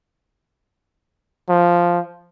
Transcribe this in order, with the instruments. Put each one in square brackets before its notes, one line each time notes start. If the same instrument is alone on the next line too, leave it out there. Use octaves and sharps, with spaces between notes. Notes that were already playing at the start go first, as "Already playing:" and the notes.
[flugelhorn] F3